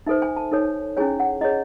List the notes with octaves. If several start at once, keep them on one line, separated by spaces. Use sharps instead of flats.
D#4 A4 C5 E5
G#5
A5
D#4 A4 C#5
C#4 E4 G#4 C#5 G#5
F#5
E4 G#4 C#5 D#5